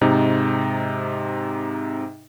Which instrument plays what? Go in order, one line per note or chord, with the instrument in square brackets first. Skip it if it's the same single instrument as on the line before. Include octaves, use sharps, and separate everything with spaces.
[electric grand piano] G#2 C3 D#4